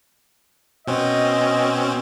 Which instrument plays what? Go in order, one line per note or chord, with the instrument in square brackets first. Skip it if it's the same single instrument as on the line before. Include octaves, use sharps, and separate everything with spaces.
[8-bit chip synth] B2 C4 C#4 [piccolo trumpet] D#5